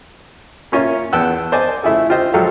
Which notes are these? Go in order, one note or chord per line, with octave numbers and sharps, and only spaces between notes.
A#3 C#4 F4 C#5 E5
E2 B3 G5 A5 E6 F#6
C5 D5 D#5 G#5 A5
A3 E4 F4 G#4 A4
F4 G4 C5 D#5
F3 F#3 G#3 G4 A4 F5